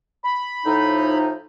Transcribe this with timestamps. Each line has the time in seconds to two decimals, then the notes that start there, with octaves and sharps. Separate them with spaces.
0.24 B5
0.66 A2 F3 D#4